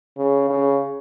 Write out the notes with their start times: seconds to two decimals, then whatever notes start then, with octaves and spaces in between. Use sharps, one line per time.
0.17 C#3
0.50 C#3